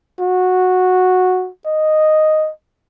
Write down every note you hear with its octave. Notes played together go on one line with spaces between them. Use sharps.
F#4
D#5